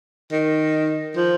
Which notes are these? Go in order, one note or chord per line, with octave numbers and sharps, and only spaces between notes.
D#3
F3